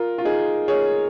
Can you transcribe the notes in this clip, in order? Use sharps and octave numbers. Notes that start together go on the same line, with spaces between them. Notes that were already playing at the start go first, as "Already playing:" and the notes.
Already playing: F4 A#4
F4
D#4 G#4
G#4 C#5